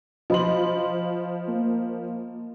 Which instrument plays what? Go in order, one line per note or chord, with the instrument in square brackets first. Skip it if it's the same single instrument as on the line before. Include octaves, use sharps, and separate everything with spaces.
[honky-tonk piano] F3 F#7 [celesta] D#5 B5 C6
[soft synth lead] A#3